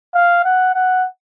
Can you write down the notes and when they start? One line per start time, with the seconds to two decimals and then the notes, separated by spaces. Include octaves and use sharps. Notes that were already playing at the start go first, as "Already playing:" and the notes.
0.14 F5
0.45 F#5
0.74 F#5